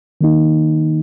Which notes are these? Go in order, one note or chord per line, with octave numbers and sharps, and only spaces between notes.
D#3 A#3 D#4